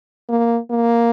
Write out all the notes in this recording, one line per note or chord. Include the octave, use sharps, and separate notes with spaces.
A#3
A#3